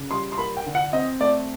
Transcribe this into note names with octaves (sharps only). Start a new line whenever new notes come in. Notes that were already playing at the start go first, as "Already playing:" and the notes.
Already playing: C#3
G3 C6
C6
A#3 B5
G5
D3
F#5
C4 D#5
A3 D5